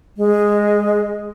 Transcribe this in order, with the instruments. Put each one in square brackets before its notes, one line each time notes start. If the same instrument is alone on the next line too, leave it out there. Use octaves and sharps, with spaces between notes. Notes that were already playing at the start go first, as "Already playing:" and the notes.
[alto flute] G#3